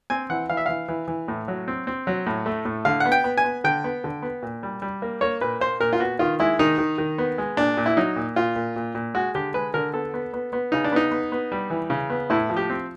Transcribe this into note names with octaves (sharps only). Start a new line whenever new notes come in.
C4 G#5
E3 F#5
E3 F5
E5
E3 F5
E3
E3
A2
F#3
C4
C4
F#3
A2
A3
A2
D3 F5
F#5
B3
G5
B3
G#5
B3
D3 G5
B3
D3
B3
A#2
G3
G3
A#3
A#3 C#5
A#2 B4
A#3 C5
A#2 A#4
F4
B3 F#4
D#3 F4
G#3 E4
D#3 D#4
D#3
D#3
B3
G#3
A#2 D4
A#2
E4
F#3 D#4
A#2
A#2 F4
A#2
A#2
A#2
G#3 F#4
D3 G4
G#3 B4
D3 A#4
B3 A4
B3
B3
B3
C#3 D#4
D4
B3 D#4
B3
B3
G3
E3
C#3
B3
A2 E4
F3
G4
C4